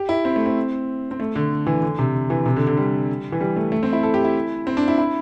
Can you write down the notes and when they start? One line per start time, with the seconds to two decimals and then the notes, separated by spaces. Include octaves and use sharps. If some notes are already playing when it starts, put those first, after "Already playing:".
Already playing: G4
0.09 E4
0.25 C4
0.36 A3
0.46 C4
1.11 C4
1.20 A3
1.36 D3
1.67 E3
1.82 D3
1.99 C3
2.30 E3
2.46 C3
2.56 D3
2.67 D3
2.77 G3
3.32 E3
3.41 G3
3.56 A3
3.72 A3
3.83 C4
3.93 E4
4.03 A4
4.14 G4
4.25 E4
4.67 C4
4.77 D4
4.88 E4
4.98 E4